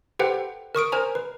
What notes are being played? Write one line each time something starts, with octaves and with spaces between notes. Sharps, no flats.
G4 A4 B4 C5 F#5 G5
A#4 C#6 D#6 D7
A#4 C5 G#5 A#5
B4